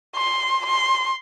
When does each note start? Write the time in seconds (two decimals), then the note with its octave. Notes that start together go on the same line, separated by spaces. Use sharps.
0.16 C6
0.66 C6